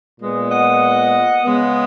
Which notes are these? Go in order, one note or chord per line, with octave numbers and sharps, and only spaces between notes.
A#2 G#3 B3
D#5 F#5
C#3 G#3 B3